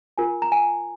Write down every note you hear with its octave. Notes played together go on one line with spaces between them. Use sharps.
F4 A#4 G#5
A#5
G#5